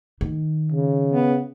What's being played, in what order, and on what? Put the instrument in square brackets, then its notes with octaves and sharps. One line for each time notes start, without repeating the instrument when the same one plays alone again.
[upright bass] D#3
[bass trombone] C#3
[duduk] B3